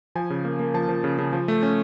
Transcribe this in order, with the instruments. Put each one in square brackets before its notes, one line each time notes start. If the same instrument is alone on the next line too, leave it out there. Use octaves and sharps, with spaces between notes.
[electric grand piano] F3 G#5
C#3
A#3
A#3
F3 A5
F3
C#3
C#3
F3
A3
C#4